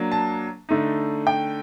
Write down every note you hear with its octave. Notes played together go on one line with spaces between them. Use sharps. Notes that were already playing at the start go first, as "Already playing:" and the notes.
Already playing: F#3 A#3 D4
A5
D3 A3 D#4
G5